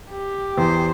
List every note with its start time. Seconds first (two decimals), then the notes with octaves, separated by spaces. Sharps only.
0.11 G4
0.58 E2 C5